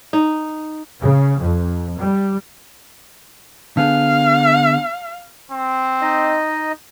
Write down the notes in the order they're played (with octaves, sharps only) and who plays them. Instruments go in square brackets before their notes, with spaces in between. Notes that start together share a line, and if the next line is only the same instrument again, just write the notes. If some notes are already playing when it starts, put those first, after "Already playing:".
[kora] D#4
[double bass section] C#3
F2
G3
[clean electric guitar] D3 B3 G#4 [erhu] F5
[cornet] C4
[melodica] D#4 D#5